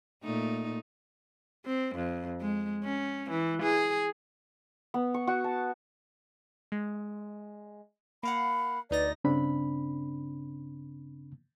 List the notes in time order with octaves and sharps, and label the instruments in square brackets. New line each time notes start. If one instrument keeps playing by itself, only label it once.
[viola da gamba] A#2 A3 D#4
C4
F2
G#3
C#4
E3
G#4
[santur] B3
C#6
F#4
A5
[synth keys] G#3
[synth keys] A#3 F5 F#5 [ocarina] B5
[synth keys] D2 D#4 A#6 [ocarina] B4 [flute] D5
[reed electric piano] G2 C#3 C4 D4 B5